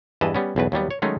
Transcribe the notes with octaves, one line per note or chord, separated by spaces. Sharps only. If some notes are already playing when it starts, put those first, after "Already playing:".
E2 G2 E3 B4 D#5 A5
G3 B3 C#4
B1 E2 B4
D#2 F#3 G3 B3
C#5
D#3 F#3 G#3 A3 C#4 D#4